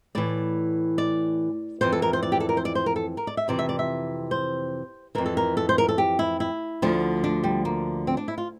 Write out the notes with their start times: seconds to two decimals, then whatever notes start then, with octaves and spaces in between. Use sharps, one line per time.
0.15 A2 E3 D5
0.98 D5
1.81 F2 E3 C5
1.92 A4
2.02 A#4
2.13 C5
2.23 D5
2.32 G4
2.40 A4
2.49 A#4
2.57 C5
2.65 D5
2.75 C5
2.86 A#4
2.96 A4
3.17 A#4
3.27 D5
3.37 E5
3.48 F2 C3 E3 D5
3.59 E5
3.69 D5
3.79 E5
4.31 C5
5.15 F2 E3 A#4
5.26 A4
5.37 A#4
5.57 A4
5.69 C5
5.78 A#4
5.89 A4
5.98 G4
6.19 E4
6.40 E4
6.82 D2 D3 F3
7.24 D4
7.44 G3
7.65 A#3
8.07 C4
8.17 D4
8.28 E4
8.38 F4